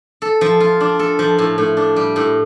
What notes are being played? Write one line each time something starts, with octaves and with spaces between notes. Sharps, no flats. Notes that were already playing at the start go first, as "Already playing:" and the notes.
A4
F3
F4
D4
A4
F3
A2
A2
D4
G3
A2